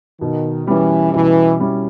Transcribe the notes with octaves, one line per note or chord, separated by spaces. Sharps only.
B2 D#3
E3 G3 C#4 E4
B2 E3
G3 C#4 E4